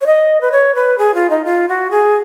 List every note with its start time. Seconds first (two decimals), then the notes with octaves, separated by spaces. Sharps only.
0.01 C#5
0.06 D#5
0.41 B4
0.52 C#5
0.75 B4
0.98 G#4
1.14 F4
1.30 D#4
1.45 F4
1.69 F#4
1.91 G#4